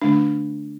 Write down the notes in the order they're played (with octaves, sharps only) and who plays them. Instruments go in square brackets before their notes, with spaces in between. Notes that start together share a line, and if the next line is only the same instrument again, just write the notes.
[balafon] D3 A3 D4